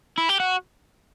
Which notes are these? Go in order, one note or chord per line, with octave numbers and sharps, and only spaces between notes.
E4
G4
F#4